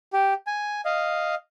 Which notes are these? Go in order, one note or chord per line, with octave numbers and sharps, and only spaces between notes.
G4
G#5
D#5 F5